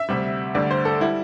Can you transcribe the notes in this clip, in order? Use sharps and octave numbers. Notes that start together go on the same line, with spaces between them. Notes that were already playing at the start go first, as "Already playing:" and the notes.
Already playing: E5
D2 C3 G3
D2 D3 G3 D5
C5
A4
G3 E4